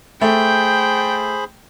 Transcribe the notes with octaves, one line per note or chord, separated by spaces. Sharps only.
A3 G#4 C5 G5 B5